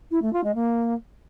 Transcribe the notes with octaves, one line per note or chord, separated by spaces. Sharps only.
E4
A3
F4
G#3
A#3